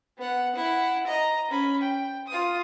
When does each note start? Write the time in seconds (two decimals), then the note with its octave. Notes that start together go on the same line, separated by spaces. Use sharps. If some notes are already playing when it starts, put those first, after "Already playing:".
0.17 B3 F#5
0.56 E4 F#5
1.07 D#5 A#5
1.50 C#4 B5
1.81 G5
2.28 F4 D#6